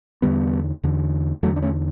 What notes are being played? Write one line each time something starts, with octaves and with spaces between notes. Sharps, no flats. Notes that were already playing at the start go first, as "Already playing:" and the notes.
E2 D3 G3 B3
E2 D3
E2 D3 F#3 A3
D4
A3 C#4